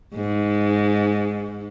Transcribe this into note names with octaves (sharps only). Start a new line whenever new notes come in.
G#2